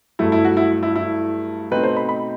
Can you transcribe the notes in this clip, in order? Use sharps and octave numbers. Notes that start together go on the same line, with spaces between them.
G2 F#3 A3 E4
E4
F#4
E4
E4
E4
B2 A3 C4 D#4 B4
C5
B5
B5